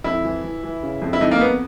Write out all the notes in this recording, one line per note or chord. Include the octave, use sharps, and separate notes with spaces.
F2 E4
E3
E3
E3
C#3
F2
E4
F2 D#4
A#3
F2 B3